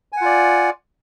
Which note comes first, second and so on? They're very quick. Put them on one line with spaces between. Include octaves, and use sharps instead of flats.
G#5 F#5 F4 D5